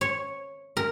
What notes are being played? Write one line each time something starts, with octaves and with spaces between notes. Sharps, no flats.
C#5
A#4